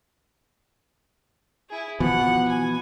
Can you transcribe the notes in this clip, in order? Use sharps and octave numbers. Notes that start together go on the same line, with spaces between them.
E4 G#4
B2 E3 F3 F#5
G#5